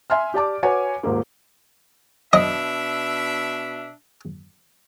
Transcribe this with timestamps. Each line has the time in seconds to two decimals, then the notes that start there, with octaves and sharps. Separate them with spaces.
0.10 E5 G#5 C6 F6
0.34 G4 D5 A5 D6
0.63 F#4 B4 C#5 G#5
1.03 D#1 G#2 A#3
2.33 B2 D4 D#5 E5